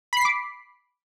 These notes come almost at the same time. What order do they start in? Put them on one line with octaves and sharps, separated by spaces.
B5 C7 B6 D6